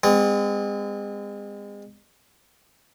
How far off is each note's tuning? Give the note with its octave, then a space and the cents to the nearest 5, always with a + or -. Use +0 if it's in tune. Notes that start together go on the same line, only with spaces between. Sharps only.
G#3 -35 C4 -45